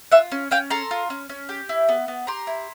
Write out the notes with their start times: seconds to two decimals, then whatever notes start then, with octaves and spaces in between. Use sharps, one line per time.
0.12 F4 E5 F#5
0.32 C#4
0.51 C#4 F5 G5
0.70 A4 A#5 C6
0.91 F4
1.10 C#4
1.29 C#4
1.49 G4
1.69 E4
1.89 B3
2.08 B3
2.27 G4 A#5 C6
2.47 E4